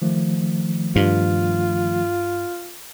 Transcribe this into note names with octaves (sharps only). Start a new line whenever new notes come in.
D#3 F3 A3
G2 F4